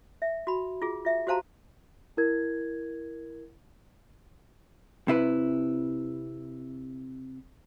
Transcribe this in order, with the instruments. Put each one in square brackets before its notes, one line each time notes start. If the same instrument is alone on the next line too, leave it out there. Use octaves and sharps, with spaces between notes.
[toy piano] E5
F#4 B5
F4 G#4
F4 E5
F#4 G4 C5 F5 A5 A#5
[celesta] E4 A#4 G#6
[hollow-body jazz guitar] C3 E4 B4